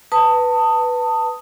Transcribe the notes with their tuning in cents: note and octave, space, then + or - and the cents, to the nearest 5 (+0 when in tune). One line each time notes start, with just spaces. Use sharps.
B4 +0 A5 +25 D#6 +0